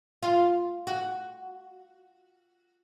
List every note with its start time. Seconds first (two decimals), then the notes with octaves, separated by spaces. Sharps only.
0.23 F4
0.87 F#4